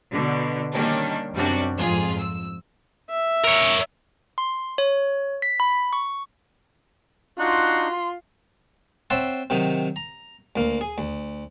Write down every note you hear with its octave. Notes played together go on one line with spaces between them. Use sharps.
B2 D3
D#3 G3 A#3 C#4 D4
F#2 C3 F#3 G3 D4 F#4
F2 G#2 F4 G#4
E6
E5
A#4 C#5
C6
C#5
B6
B5
C#6
D4 D#4 F4 F#4 C6 F#6
C4 C#5 E5 F#5 A5 C6
C3 D#3 F#3 D#4
A#5
D2 A#3
G#4
D2